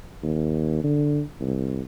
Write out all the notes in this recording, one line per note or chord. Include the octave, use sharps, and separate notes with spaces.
D#2
D3
C2